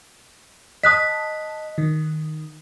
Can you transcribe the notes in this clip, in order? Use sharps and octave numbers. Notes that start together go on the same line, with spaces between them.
D#5 A5 D#6 F#6 B6
D#3